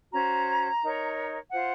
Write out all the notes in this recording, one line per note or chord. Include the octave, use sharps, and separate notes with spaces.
C#4 F#4 C5 A#5
D#4 A#4 C#5
F4 C5 F#5